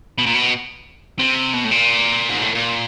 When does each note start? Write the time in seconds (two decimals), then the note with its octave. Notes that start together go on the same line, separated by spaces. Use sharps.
0.18 B2
0.26 A#2
0.35 B2
1.19 C3
1.53 B2
1.64 A2
1.71 A#2
2.29 G#2
2.42 A2
2.55 A#2